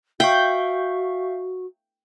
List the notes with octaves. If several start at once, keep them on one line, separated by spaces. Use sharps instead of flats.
F#4 E5 F5 G5 C#6